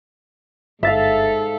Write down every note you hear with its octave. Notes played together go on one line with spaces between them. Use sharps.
G1 G#2 A4 E5 F5 A6